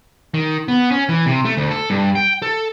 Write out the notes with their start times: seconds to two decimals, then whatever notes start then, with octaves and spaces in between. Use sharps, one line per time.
0.34 D#3
0.68 B3
0.91 C#4
1.09 E3
1.26 C3
1.45 A3
1.57 D2
1.71 A4
1.90 G2
2.15 G5
2.42 A4